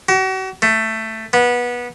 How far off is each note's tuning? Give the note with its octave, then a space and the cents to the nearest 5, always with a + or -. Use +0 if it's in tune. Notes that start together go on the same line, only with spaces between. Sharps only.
F#4 +40
A3 +10
B3 -20